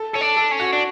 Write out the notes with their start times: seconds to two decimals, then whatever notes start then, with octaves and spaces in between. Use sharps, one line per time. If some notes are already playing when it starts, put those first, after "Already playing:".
Already playing: A4
0.13 C#4 A4
0.21 D4
0.37 A4
0.52 C#4
0.60 F#4
0.73 D4